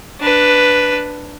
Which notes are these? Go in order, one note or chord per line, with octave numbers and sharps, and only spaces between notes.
D4 B4